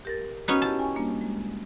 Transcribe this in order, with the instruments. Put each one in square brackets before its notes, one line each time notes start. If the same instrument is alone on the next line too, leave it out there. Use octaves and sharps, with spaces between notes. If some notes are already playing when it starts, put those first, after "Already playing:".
[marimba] G4 A#4 A6
[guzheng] B3 C#4 D#4 [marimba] F#4
[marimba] E4 G4 [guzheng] A5
[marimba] G5 G#5 C#6
G3 A#3 D4
G#3